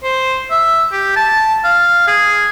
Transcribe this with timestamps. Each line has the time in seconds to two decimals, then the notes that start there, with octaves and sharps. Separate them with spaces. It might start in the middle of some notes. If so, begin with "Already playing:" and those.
0.03 C5
0.51 E5
0.92 G4
1.16 A5
1.65 F5
2.08 G#4